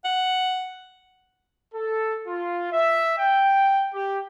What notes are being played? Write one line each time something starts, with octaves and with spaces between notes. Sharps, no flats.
F#5
A4
F4
E5
G5
G4